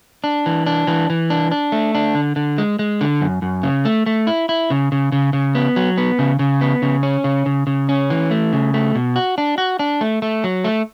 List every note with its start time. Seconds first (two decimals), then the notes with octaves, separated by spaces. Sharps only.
0.24 D4
0.46 E3
0.66 D4
0.87 E3
1.10 E3
1.30 D4
1.52 D4
1.72 A3
1.95 D4
2.15 D3
2.36 D3
2.58 G#3
2.79 G#3
3.01 D3
3.21 F#2
3.42 F#2
3.63 C#3
3.85 A3
4.06 A3
4.27 E4
4.49 E4
4.70 C#3
4.92 C#3
5.12 C#3
5.33 C#3
5.55 B3
5.76 F#3
5.98 B3
6.19 C#3
6.39 C#3
6.61 B3
6.82 C#3
7.03 C#4
7.24 C#3
7.46 C#3
7.67 C#3
7.89 C#4
8.10 E3
8.31 A3
8.53 C#3
8.74 A3
8.95 B2
9.16 F#4
9.38 D4
9.58 F#4
9.79 D4
10.01 A3
10.22 A3
10.44 F#3
10.64 A3